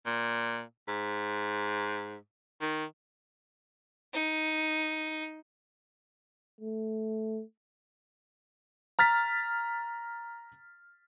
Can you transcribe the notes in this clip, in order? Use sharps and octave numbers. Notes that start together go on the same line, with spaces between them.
A#2
G#2
D#3
D#4
A3
A#5 F6 A6 B6